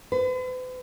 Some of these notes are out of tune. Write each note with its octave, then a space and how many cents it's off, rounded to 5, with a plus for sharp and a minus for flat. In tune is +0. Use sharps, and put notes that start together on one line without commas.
B4 +45